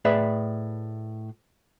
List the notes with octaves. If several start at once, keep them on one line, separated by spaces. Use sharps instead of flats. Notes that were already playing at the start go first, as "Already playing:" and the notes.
A2 G#4 B4 D5 E5